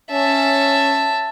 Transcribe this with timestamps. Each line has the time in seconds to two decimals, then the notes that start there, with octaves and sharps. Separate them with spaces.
0.12 C#4 E5 A5